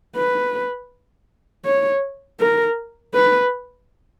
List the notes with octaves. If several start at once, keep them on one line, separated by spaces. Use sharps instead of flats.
B4
C#5
A#4
B4